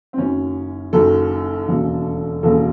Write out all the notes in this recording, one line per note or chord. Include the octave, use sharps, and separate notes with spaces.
C4
F#1 F#2 D#3 C#4
F#1 F#2 D#3 A4
E1 D#2 C#3 F#3
E1 D#2 C#3 F#3 A4